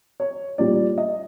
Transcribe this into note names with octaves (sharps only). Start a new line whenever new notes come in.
C#5
A#2 G3 D5
D#5